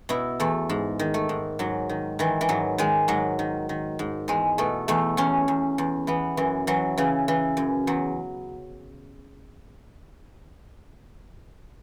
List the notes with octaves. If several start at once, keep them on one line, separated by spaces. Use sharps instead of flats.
B2 E4
E2 A3
G#2
D#3
A3
G#2
G#2 F#3
D#3
D#3 E3
E3
G#2 F#3
D#3 G#3
G#2 F#3
D#3
D#3
G#2
E2 G#3
B2 A3
E2 A3
E2 C#4
E2
E2
E3 B3
F#2 E3
E3 F#3
C#3 E3
E3
F#2
E2 F#3